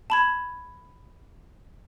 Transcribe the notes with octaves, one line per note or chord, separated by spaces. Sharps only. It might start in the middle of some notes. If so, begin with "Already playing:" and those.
A5 B5 G#6